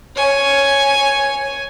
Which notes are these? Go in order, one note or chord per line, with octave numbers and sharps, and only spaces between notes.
C#5 G#5